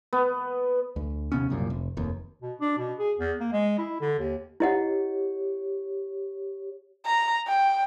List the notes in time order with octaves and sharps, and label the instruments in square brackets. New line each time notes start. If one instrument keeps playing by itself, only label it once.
[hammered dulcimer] B3
[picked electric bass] D2
D#2 C3 B3 C#4
F#1 C2 F#2 A#2
F1
F1 D#2
[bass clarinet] B2
D4
B2
G#4
E2
A#3
G#3
E4
D3
D#2
[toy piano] E4 D#5 F#5 [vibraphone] G4 C#5
[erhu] A#5
G5